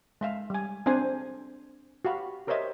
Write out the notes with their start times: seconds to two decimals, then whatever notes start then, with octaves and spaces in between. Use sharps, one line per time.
0.21 G#3 E5 F5
0.50 G3 G#5
0.86 C4 D4 G#4 C5 G#5
2.05 F#4 G4 F5 B5
2.47 G4 A#4 C5 C#5 D#5 E5